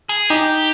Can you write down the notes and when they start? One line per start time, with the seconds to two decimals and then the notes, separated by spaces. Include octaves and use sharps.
0.09 G#4
0.30 D#4 G4